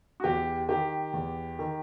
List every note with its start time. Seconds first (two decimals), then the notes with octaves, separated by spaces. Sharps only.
0.20 F#4
0.24 E2 G4
0.69 D#3 G4
1.13 E2
1.59 D#3